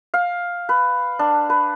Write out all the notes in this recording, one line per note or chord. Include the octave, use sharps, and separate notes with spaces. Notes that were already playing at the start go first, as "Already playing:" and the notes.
F5
B4
D4
B4